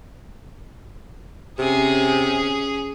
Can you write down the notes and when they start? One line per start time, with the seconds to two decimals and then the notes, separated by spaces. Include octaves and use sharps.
1.59 C3 C#4 G#4